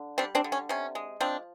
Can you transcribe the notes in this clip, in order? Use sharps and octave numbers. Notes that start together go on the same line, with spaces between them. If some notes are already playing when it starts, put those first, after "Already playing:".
Already playing: D3
G3 C4 D4
C4 D4
D3
C#4
C3 C#4
G#3
F3 C4 D4